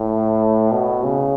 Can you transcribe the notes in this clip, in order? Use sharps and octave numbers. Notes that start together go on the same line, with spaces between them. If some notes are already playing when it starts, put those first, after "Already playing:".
Already playing: A2
B2
C#3